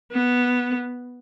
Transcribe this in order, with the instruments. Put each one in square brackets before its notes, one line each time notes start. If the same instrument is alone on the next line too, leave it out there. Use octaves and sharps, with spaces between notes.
[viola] B3